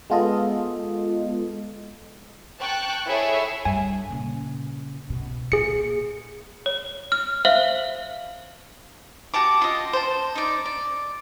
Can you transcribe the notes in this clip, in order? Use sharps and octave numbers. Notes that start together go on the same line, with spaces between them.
G#3 B3 F4 A4 D#5
G5 A5 C#6 F#6
E4 G#4 A4 C#5 E5
G2 G#5
A#2 C#3
B2
A#2 G#4 C#7
C#5
F6
C5 E5 F5 F#7
F#4 G4 A5 D6
F4 D#5
C5 A5
D#4 D5
D5